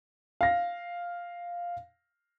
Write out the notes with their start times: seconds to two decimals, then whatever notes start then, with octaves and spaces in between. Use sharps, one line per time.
0.41 F5 A#6